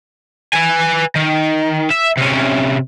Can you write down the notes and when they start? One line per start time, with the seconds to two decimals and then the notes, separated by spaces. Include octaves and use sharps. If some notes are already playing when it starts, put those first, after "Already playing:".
0.53 B4 G#5
1.16 D#3
1.90 E5
2.17 C3 C#4